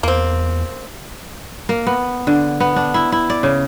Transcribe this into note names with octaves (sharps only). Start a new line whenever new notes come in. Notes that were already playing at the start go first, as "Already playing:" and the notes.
E2 A#3 C4
A#3
B3
D3
B3
D4
E4
E4
D5
C#3